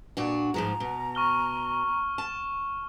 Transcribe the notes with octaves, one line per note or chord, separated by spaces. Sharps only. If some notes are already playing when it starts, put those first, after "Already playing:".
A#2 D4 F#4
G#2 F3 G#3 A#5
B2
C#6 F6 G7
A5